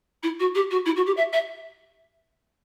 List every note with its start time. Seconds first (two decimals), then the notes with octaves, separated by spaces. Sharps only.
0.23 E4
0.40 F#4
0.55 G4
0.71 F#4
0.86 E4
0.96 F#4
1.06 G4
1.17 E5
1.33 E5